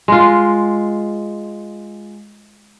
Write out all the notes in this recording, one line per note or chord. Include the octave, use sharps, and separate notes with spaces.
G#3 F4